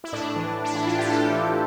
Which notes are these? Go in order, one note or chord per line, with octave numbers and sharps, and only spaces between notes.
E4
A2 D4
E3
A2 D4
E4
E3 F4
G4
E3 A4
E3